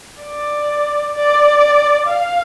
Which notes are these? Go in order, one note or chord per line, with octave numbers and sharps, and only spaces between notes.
D5
D5
F5